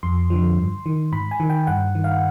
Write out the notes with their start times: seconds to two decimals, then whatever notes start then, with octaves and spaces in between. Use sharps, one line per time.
0.03 F2 C6
0.30 D3 F3
0.58 G2
0.86 D#3
1.12 G#2 B5
1.31 G#5
1.40 D#3
1.50 G5
1.67 G2 F#5
1.95 D#3
2.04 F5